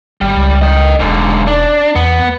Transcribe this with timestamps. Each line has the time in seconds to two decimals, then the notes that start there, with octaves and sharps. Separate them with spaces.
0.21 G#1 G3
0.36 C#2
0.61 D#5 G5
1.00 E1 G#2 D3
1.47 D4
1.95 E2 B3